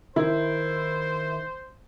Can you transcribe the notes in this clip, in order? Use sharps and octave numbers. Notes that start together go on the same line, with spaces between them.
D#3 E4 C5